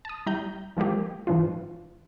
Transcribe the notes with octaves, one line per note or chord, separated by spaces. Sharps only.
A5 D#6
G3 E4 A#5 G6
E3 F3 G#3 A#3 G4
G#2 E3 F3 D4 F4